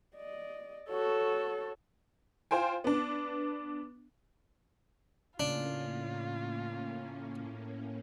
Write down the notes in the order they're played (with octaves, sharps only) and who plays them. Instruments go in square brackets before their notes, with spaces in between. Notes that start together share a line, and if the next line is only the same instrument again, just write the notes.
[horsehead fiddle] D5 D#5
[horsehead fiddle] F#4 C#5 [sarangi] A4
[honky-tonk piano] F4 C5 G5 G#5
B3 D4
[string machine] A2 A#3 C#4 [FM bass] C#3 [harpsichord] D4 [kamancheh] F4